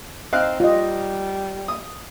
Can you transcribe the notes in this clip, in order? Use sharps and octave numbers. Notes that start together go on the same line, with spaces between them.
C4 D#4 F5 F#6
G3 F4 D#5
D#6